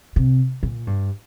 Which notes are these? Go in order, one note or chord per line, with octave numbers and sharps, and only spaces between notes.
C3
A#2
G2